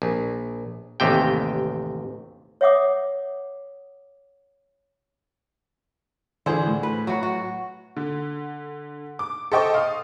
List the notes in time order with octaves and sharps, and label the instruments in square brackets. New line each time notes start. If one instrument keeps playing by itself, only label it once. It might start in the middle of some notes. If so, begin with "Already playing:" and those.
[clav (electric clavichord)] A#1
A1 D#2 C3 G5
[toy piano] C#5 E5 F#5 D6 D#6
[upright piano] D3 E3 [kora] G#4 C5
[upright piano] A2
[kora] B4
F#3 F#4
F#4
[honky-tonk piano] D3
D6
A4 C5 D#5 G5 C#6 D6
F5 D#6